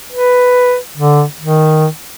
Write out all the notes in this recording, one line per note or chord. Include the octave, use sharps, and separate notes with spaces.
B4
D3
D#3